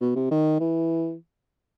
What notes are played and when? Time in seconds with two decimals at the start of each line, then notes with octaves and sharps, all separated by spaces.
0.01 B2
0.15 C3
0.31 D#3
0.60 E3